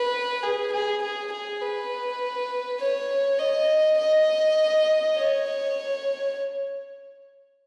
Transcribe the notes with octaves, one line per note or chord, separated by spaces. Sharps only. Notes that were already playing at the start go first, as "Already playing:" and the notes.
Already playing: B4
G#4
G#4
G#4
G#4
B4
C#5
D#5
D#5
C#5